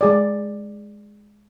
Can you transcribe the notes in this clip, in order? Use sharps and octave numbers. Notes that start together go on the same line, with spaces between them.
G#3 G#4 D5